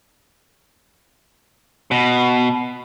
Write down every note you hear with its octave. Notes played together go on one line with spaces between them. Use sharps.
B2